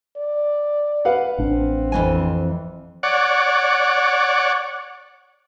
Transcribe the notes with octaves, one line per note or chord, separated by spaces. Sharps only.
D5
B4 F5 F#5
A1 C4 D4
F2 E3 G#5
C#5 D5 F#5